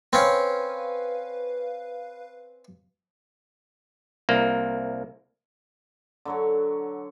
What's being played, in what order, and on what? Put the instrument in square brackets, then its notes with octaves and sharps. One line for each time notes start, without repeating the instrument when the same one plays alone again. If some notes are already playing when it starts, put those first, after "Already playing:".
[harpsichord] C4 C#4 [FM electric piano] B4 F5
[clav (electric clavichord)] C2 A#3
[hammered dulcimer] D3 F#3 C#5